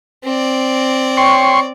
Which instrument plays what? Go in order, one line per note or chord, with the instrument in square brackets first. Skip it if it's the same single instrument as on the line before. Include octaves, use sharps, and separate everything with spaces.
[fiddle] C4 D5
[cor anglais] C#5 [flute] G5 [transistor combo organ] C6 C#6